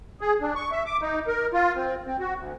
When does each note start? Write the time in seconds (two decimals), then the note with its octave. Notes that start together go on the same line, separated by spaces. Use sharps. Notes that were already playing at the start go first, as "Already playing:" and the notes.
0.21 G#4
0.41 D4
0.55 C#6
0.72 E5
0.86 D6
1.02 D#4
1.27 A#4
1.53 F4
1.76 C4
2.07 C4
2.20 F#4
2.37 D2